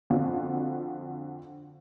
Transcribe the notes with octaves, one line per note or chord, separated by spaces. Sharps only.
F2 D3 F4 F#4